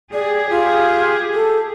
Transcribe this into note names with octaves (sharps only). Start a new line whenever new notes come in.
G4 G#4 D5
F4
A4